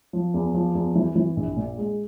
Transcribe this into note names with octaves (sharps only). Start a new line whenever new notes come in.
F3
E2
F3
E2
E3
E3
A#1
A#2
G#3